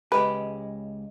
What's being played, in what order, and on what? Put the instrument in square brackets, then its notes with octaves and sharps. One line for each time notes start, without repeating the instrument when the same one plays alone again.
[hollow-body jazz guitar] C#2 G#3 G4 [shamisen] B4